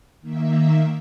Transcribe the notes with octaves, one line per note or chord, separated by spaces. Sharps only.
D#3 A#3 E5